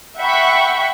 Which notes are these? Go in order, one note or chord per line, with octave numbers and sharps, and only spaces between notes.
E5 F#5 G5 B5 C#6